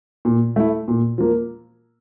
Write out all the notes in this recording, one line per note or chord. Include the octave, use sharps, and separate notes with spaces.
A#2
A3 E4
A#2
F3 A#3